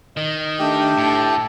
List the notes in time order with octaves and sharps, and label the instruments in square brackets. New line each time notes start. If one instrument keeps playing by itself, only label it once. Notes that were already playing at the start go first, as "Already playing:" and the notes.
[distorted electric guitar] D#3 [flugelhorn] D#5
[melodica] A3 G4 G5 [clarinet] D4
[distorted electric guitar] A2 [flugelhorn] A5